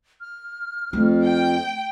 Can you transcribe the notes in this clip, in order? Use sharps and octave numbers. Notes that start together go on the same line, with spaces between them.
F6
F2 A3
G5